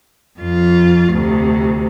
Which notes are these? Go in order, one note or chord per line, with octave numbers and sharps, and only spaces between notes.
F2 F4
D2 C3